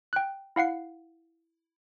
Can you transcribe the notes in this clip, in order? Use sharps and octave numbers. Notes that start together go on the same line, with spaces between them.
G5 F#6
E4 F5 F#5 C7